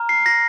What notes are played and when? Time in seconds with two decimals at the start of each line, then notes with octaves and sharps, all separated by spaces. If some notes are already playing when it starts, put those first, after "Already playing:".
Already playing: A#5 F6
0.09 C7
0.26 A#6